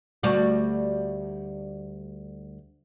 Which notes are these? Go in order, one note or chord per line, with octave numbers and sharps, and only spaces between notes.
D2 G3 F#4